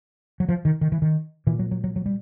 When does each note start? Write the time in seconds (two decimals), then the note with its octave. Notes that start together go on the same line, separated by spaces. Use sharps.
0.40 F#3
0.49 F3
0.65 D#3
0.81 D#3
0.92 E3
1.02 D#3
1.47 A#2 E3
1.59 F#3
1.71 F#3
1.84 F#3
1.96 F#3
2.06 G3